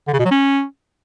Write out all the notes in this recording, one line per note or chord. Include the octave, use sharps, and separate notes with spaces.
D3
C#3
B2
F#3
C#4